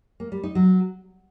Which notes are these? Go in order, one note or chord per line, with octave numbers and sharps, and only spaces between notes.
A#3
G3
D#4
F#3